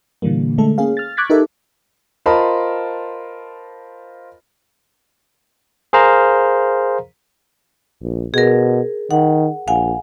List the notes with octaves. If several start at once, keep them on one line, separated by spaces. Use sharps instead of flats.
A#2 D3 E3 G3 A#3
D3 G#3 A3 A4
A#3 C#4 G#4 F5
F6 A6
C#6 D6 F#6 G#6 A6 B6
D#4 G4 A4 A#4 E5
F4 A#4 C5 D#5 A5 B5
G#4 A#4 C5 F5 A#5
A#1
B2 G#4 A#4
D#3 F#5
A#1 F5 F#5 G#5